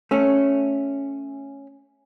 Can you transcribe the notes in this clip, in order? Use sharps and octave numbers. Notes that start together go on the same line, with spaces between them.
A3 C#4